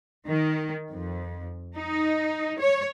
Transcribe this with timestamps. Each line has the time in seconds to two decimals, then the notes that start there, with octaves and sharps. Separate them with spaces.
0.26 D#3
0.92 F2
1.77 D#4
2.61 C#5